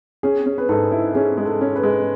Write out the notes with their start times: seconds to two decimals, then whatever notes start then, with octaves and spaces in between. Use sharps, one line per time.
0.23 C#4 G#4
0.46 C#4
0.58 B4
0.69 G#2 A4
0.91 E4
1.14 C#4 G#4
1.37 G#3
1.45 A4
1.61 C#4
1.76 B4
1.83 G#3